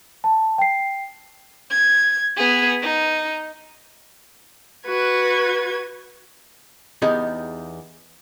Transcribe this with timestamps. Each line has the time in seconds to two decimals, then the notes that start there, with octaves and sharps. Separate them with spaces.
0.24 A5
0.58 G5 C7
1.71 G#6
2.37 B3 G#4
2.82 D#4
4.87 F#4 B4 G#6
7.02 E2 B3 D#4 G4 G#4